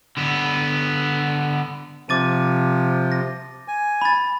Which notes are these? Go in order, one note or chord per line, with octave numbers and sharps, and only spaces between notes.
D3 B3
C3 F3 D6 A6 D#7
A#6
G#5
B5 A6